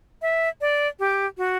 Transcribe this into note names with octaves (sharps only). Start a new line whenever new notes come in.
E5
D5
G4
F#4